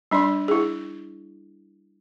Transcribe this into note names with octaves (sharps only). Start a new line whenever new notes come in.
G3 D4 D5 C6
E4 G#4